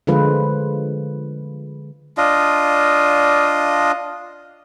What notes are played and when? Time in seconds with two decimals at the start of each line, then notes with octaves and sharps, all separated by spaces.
0.07 D3 F3 G#3 F4 B4
2.17 D4 F4 D#5